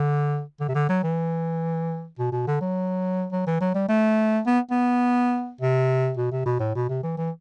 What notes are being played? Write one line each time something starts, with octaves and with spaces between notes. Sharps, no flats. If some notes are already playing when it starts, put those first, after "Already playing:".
Already playing: D3
D3
C3
D3
F#3
E3
B2
B2
D3
F#3
F#3
E3
F#3
G3
A3
B3
B3
C3
B2
C3
B2
A2
B2
C3
E3
E3